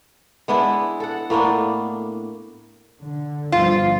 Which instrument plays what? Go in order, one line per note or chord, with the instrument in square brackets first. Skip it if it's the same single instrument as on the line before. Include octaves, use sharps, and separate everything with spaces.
[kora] G#3 B3 D4 E4
A4 F#5
A2 A#3 B3 D4
[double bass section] D3
[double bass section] G1 D3 F3 [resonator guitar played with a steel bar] F4